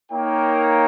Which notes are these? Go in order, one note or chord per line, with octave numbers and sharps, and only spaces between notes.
A#3 D#4 A#4 C#5 G5